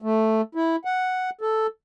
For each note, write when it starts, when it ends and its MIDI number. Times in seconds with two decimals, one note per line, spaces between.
0.02 0.41 57
0.55 0.76 64
0.85 1.30 78
1.41 1.67 69